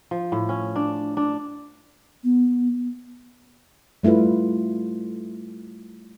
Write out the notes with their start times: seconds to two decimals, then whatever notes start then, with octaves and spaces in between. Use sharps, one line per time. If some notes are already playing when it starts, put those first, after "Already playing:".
0.11 F3
0.32 A2
0.49 C#4
0.76 D4
1.17 D4
2.24 B3
4.03 G3 A3 E4 F4 B4